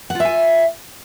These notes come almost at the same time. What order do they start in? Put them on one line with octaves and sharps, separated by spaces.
F#5 F4 E5 G#5